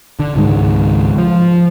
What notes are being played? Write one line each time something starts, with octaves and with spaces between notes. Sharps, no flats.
D3
C#2 G#2 D#3 G#3
F3